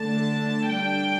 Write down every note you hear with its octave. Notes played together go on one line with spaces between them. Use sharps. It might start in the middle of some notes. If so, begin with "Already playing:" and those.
Already playing: D3 A3 D4 A5
G3 D4 G5